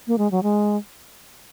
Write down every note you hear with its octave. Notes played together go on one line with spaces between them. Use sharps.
A#3
G#3
F#3
G#3